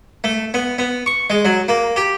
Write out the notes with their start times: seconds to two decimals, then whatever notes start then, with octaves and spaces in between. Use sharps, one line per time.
0.24 A3
0.54 B3
0.79 B3
1.06 C#6
1.30 G#3
1.45 F#3
1.68 A#3
1.96 G4